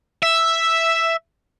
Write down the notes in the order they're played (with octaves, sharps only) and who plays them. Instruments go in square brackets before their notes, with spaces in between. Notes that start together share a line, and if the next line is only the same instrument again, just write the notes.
[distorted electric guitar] E5